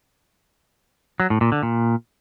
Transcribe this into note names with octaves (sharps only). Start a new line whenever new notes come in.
F#3
A2
A#2
D3
A#2